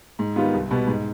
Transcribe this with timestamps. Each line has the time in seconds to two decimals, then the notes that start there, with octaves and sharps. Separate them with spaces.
0.19 G#2
0.36 D#3 G3 B3 F4
0.54 C2
0.71 B2 G3 B3
0.87 G#2